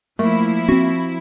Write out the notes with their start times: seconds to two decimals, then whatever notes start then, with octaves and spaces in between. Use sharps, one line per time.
0.19 F3 A3 A#3 E4
0.69 C4 C#4 F#4